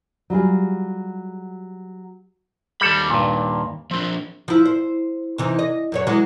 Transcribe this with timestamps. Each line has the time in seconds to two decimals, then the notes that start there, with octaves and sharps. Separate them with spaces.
0.30 F#3 G3 F4 G#4
2.81 D#2 G3 A4 B5
3.10 G2 A#2
3.91 F3 C4 D4
4.48 F3 E4
4.66 C5
5.38 C3 E3 D#4
5.59 D#5
5.92 F#2 F#3 C#5
6.07 E3 F#3 G#3